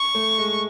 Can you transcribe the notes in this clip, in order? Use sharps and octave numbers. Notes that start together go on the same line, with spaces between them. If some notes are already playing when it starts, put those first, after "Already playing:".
Already playing: C#6
A3
G#3